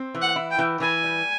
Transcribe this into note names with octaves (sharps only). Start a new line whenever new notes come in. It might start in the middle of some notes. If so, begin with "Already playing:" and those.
Already playing: C4
E3
F#5
E4
G5
E3
E3 G#5
G3